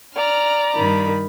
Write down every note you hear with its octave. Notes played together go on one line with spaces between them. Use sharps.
D5 A#5 F6
G2 D#3 B5